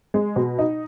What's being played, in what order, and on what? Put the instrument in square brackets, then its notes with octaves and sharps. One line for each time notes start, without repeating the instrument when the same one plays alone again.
[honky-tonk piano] G#3
B2
D#4